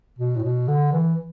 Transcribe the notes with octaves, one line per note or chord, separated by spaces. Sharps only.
B2
A2
B2
D3
E3